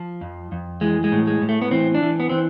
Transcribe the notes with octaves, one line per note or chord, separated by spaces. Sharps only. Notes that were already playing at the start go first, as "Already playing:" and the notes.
Already playing: F3
F2
F2
E3 G#3
G#3
A2
G#3
A2
A3
B3
E3 C4
D4
E3
B3
E3 C4